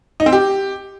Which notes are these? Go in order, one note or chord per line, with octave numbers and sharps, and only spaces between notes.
D#4
C4
G4